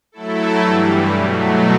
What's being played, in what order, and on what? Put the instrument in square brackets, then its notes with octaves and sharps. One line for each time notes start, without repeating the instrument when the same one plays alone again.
[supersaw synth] F#3 A3 E4 A4
G2 E3 G3
B2 F#3 A3